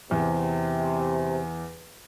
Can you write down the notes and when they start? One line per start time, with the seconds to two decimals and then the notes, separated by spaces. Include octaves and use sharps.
0.11 E2 C3